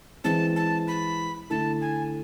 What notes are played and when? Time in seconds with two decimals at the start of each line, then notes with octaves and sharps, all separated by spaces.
0.24 E3 G#3 C4 A5
0.56 A5
0.88 B5
1.50 D3 A3 E4 A4 A5
1.81 G#5